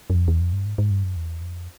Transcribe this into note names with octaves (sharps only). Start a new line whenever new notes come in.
F#2
F2
E2
F2
G2
G#2
G#2
G2
F#2
E2
F2